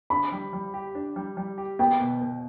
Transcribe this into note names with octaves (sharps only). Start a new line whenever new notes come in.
D4 B5
G3
G3
G4
D4
G3
G3
G4
B3 G5
B2
B2